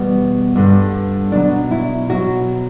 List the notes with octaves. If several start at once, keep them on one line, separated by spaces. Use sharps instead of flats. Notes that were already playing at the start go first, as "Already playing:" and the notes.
Already playing: E2 B2 G3 B3
G2 D3 G3
B2 F#3 D4
E4
B2 F#3 F#4